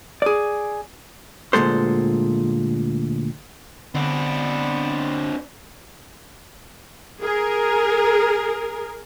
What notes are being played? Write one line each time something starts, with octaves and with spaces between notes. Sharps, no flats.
G#4 D5
D2 A#2 D#3 G#3 A4 C5
D3 B3 C4 D4
G#4 A#4